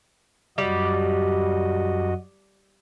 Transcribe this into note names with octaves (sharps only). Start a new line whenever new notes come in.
F#2 G3 F#4 D#5